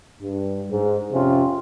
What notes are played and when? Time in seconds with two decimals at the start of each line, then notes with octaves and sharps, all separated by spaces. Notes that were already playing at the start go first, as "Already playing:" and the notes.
0.20 G2
0.70 G#2
1.11 F2 C3 C#4 F4